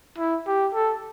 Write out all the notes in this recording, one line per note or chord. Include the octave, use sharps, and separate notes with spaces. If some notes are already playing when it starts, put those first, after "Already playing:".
E4
G4
A4